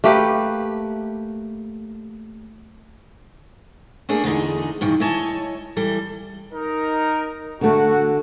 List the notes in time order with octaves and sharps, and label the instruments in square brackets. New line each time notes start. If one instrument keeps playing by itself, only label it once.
[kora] A3 A#3 G4 B4
[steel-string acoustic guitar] A3 A#3 D4 G#4
E2 D3 D#4 G#4
G2 B2 D#3 E3
E4 C#5 D#5 G#5 A5
E3 G3 A4
[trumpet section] D#4 A#4
[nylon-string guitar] D3 A3 [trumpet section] F#4